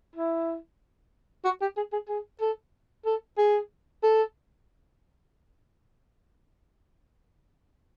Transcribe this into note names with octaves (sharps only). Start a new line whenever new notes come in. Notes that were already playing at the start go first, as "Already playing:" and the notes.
E4
F#4
G4
G#4
G#4
G#4
A4
A4
G#4
A4